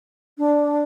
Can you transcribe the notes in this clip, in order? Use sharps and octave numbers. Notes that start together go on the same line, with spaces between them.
D4